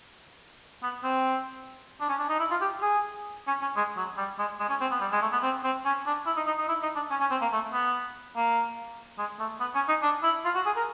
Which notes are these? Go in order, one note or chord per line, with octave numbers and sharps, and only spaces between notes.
B3
C4
D4
C#4
D4
D#4
E4
F4
G4
G#4
C#4
C#4
G#3
F#3
G3
G#3
G#3
C#4
C4
B3
G3
G#3
A3
B3
C4
C4
C#4
D4
E4
D#4
D#4
D#4
E4
D#4
D4
C#4
C#4
C4
A#3
A3
B3
A#3
G#3
A3
B3
C#4
D#4
D4
E4
F4
F#4
G#4
A#4